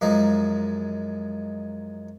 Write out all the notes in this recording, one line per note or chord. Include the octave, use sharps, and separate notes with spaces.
F#2 F3 G#3 D#4